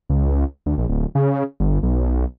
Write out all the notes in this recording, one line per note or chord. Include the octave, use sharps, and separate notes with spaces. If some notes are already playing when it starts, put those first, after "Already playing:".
C#2
D2
A#1
D1
C#3
G1
B1